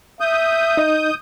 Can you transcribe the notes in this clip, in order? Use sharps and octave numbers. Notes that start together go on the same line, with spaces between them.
E5 D#6 G6
D#4 D#5